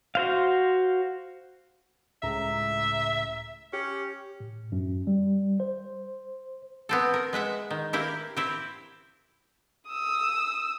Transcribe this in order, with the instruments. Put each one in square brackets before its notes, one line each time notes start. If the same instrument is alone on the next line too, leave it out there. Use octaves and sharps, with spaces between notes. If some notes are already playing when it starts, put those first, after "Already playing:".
[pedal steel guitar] F#4 C5 F5
[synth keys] C#2 A2 A#5 [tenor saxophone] E5
[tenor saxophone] C#4 [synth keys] G4
[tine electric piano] A2
F#2
G3
C5
[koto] B3 C4 A4
A#4
G#3 B4 E5 F#5
D#3
A#3 E4 G4 A#4
C4 E4 G4
[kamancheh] D#6 E6